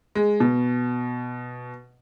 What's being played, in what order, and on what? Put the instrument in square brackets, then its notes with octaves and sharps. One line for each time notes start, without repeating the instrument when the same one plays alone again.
[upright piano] G#3
B2